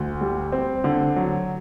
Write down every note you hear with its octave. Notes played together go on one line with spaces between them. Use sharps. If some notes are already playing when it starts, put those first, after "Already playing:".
Already playing: D2
G3
C4
D3
F#3